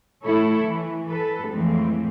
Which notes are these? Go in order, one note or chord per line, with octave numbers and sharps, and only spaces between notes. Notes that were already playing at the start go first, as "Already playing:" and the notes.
A2 E4 A4 C#5
E3
A4 B4
F2 A2 E3 G#3 C4